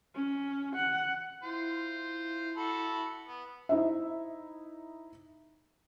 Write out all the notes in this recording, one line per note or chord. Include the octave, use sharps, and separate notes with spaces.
C#4
F#5
E4 F4 C5
F#4 A4 B5
B3
D#4 E4 C5 E5